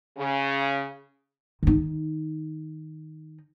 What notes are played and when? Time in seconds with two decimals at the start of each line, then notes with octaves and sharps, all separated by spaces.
0.18 C#3
1.63 D#3 D#4